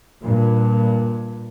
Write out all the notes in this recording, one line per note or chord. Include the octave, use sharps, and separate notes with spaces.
G2 A#2